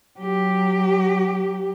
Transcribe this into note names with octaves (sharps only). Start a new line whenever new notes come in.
F#3 G4